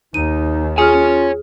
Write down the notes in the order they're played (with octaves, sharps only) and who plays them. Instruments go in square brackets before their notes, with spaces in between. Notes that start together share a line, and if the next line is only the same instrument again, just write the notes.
[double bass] D#2 [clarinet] D#4 [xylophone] D#7
[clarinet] F4 [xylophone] G#4 F6 [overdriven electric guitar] C#5 G#5